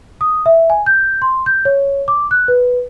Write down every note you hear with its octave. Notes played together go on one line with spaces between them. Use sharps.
D#6
E5
G#5
G6
C6
G6
C#5
D6
F#6
B4